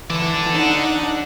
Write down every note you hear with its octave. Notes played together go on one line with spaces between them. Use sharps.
E3 A4 D5
D4 D#4 F#5